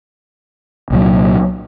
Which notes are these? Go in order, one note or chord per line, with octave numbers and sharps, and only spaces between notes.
C2 A#2 F#3